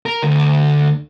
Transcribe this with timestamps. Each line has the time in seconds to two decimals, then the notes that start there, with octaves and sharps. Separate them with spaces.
0.06 A#4
0.23 D2